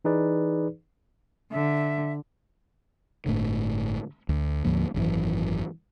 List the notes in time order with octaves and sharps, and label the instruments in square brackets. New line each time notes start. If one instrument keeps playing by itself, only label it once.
[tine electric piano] E3 D#4 G#4 B4 D5
[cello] D3 [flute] E5
[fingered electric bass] G1 A2 D3
D2
D2 G#2 F3 A#3
G#1 F#2 C3 E3